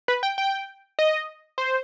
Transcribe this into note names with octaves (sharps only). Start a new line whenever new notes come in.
B4
G5
G5
D#5
C5